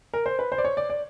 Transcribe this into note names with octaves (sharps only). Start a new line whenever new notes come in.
A#4
C5
B4
C5
D5
C#5
D5
D5